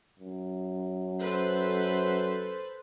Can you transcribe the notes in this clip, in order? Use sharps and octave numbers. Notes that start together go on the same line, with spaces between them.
F#2
A4 B4 C5